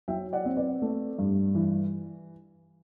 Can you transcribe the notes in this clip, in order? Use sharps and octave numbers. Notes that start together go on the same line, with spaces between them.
F#3 E5 G5
D5 F#5
C4
B4 D5
A3
G2
E3